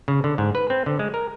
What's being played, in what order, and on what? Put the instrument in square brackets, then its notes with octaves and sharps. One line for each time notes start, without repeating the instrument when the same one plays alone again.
[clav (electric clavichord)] C#3
D3
G#2
B4
C4
D3
G#3
A#4